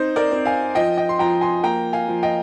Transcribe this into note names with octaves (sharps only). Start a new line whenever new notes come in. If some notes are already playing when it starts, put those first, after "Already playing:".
Already playing: C4 D#4 C5
A#4 D5
C4
F5 G#5
F3 D#5 G5
D#5 G5
C6
F3 G5 A#5
G#5 C6
A#3 G5 A#5
F5 G#5
F3
D#5 G5